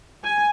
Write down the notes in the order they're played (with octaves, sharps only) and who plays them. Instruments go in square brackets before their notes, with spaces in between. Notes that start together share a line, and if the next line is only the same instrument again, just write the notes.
[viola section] G#5